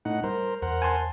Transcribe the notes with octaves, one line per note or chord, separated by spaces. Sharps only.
A2 D#4 F#5
G3 A#4 C5
E2 A#4 C5 F#5
G#5 A5 C6